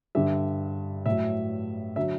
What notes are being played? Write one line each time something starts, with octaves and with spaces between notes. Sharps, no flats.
G2 D3 G3 E5
A2 F#3 E5
D3 F#3 E5